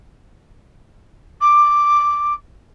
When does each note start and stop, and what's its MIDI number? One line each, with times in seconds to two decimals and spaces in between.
1.41 2.34 86